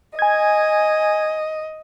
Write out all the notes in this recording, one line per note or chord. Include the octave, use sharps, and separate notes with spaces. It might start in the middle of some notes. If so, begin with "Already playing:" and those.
D#5 G#5 G#6